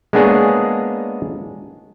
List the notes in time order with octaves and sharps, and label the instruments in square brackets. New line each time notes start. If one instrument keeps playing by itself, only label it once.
[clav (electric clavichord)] G#3 A#3 B3 D4 G#4 C#5